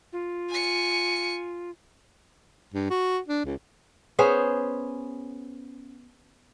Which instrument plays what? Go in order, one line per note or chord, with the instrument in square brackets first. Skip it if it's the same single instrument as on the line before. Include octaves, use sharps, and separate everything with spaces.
[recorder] F4
[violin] G#5 C#7
[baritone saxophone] G2
F#4
D4
C#2
[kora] B3 C#4 G#4 C5